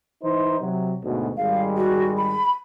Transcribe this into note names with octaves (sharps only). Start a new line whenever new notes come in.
E3 D#4 C5
C3 F#3
D2 G#2 B2
G#1 G3 G#3 F5
F#4
B5